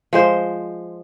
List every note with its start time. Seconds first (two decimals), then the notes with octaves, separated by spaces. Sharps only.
0.13 F3 G#3 C5